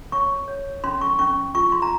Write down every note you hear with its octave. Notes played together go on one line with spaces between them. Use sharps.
C#5 C#6
C#5
C#4 C6
C#6
C#4 C#6
F4 C#6
C6
A#5